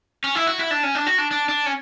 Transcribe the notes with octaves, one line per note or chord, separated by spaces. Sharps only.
C#4
E4
F#4
E4
D4
C#4
D4
F#4
D4
D4
D4
C#4